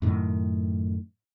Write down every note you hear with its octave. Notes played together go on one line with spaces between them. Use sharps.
F#2 A2 D#3